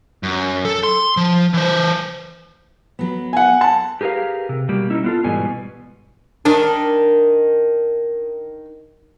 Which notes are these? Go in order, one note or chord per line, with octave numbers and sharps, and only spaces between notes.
F#2
A4
C6
F3
E3 C5
F#3 B3
F#5 G#5
A5
G4 G#4 A#4 B4 F5
C3
B2 G3 A#3 G4
C#4 D#4 E4
B3 F4 A4
G#2 B2 E3 G3 B3 G#5
D#3 D4